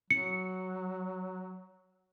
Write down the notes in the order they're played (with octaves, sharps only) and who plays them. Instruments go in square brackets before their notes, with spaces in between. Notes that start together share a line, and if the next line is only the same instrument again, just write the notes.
[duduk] F#3 [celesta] C#7